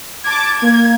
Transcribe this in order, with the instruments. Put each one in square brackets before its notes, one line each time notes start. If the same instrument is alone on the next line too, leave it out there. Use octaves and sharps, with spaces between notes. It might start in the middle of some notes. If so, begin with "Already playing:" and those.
[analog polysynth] A5 D6 [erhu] G#6
[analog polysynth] A#3